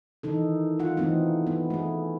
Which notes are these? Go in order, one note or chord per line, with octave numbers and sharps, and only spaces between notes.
D#3 E3 D#4 A4
F4 F#5
E3 A3 B3 C4 D#4
B3
A3 G#4